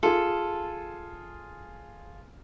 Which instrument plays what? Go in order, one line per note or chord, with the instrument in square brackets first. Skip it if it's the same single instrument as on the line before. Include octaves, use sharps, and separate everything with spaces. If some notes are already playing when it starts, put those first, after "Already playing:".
[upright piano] F4 G#4 [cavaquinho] A4